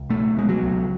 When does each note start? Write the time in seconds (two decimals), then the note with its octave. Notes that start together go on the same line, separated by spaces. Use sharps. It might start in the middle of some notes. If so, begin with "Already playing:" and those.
Already playing: C#2
0.10 B2 A3
0.36 B2 G#3
0.49 F#3
0.63 C#2